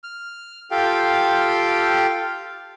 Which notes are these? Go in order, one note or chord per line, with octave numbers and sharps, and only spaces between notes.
F6
F4 G4 A4 F5 G5